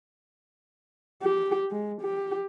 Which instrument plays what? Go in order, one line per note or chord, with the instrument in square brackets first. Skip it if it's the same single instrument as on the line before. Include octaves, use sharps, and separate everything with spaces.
[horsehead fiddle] G4
G#3
G4